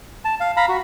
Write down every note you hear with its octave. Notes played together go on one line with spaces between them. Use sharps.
A5
F5
F5 A#5 B5
F#4